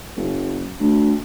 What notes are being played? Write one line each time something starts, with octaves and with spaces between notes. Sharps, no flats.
F#1
D2